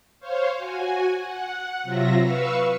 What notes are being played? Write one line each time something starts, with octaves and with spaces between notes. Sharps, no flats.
C5 C#5 F5
F#4 G#5
F#5
C3 F#3 F4 E5 A#6
B4 F5 C#6 E6